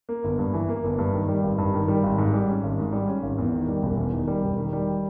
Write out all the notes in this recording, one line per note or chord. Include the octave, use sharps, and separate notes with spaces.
A#3
G1
G2
E3
A#3
G1
G2
D#3
G3
G#1
G2
D#3
G3
G#1
G#2
G3
C#4
G#1
G#2
G3
C#4
G#1
E2
D#3
G3
E1
E2
D#3
G3
E1
D#3
G3